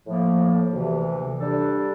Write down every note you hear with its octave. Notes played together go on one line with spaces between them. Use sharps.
A2 F3 A#3
D2 C3 E3
G3 D4 A4